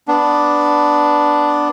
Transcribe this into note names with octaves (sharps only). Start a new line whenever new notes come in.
B3 D4